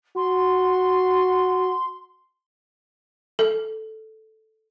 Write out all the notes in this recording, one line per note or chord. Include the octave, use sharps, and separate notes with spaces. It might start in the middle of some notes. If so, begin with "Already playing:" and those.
F#4 C6
A4